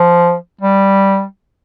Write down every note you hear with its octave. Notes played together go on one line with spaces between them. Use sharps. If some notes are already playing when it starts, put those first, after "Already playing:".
Already playing: F3
G3